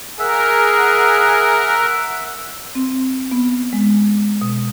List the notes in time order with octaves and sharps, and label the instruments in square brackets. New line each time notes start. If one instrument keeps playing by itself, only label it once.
[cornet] G#4 [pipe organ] A#4 [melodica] E5 [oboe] F#5
[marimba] C4
B3
G#3
B2